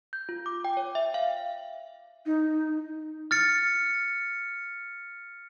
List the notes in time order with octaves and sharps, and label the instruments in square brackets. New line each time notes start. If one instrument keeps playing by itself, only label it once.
[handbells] G6
F4
D6
G5
C#5
E5
F5
[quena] D#4
[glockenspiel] F6 A6 C#7